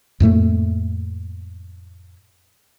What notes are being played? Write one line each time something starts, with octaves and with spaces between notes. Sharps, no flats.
F2 A2 A3 A#3